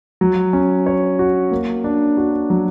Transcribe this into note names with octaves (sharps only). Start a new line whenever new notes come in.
F#3
C#4
C#5
F#4
A#3
D4
F#4
F#3